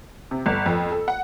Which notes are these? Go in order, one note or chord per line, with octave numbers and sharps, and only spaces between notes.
C3
G1
F2
A4
F#5